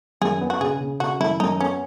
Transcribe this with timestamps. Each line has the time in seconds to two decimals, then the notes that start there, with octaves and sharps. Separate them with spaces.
0.21 F#2 G#4
0.41 B3
0.50 F#4
0.61 C#3 G#4
0.81 C#3
1.00 C#3 F#4
1.20 F#2 E4
1.40 F#2 D#4
1.61 B3 C#4